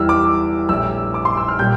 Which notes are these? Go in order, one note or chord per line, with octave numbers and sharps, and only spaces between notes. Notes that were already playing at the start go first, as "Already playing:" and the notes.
Already playing: E2 E3 G3 E6 F6
D6
A#1 A2 G3 E6
D6
C6
E6
F6
A#2 G3 G6